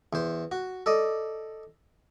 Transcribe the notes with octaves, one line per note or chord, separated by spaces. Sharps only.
E2 C5
F#4
A4 D5 D#5